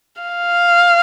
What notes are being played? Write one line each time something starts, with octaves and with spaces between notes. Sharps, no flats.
F5